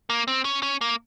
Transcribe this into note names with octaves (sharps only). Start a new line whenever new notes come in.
A#3
C4
C#4
C#4
A#3